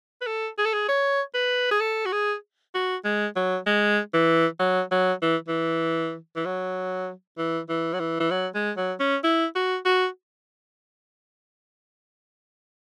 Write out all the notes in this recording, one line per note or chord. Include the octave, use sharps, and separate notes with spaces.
B4
A4
G#4
A4
G#4
C#5
B4
G#4
A4
F#4
G#4
F#4
G#3
F#3
G#3
E3
F#3
F#3
E3
E3
E3
F#3
E3
E3
F#3
E3
E3
F#3
G#3
F#3
C#4
E4
F#4
F#4